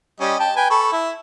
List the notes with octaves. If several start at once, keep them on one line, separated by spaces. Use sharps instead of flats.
G3 C#4 D#5
G5 A5
B4 G5 G#5
A4 B5 C#6
E4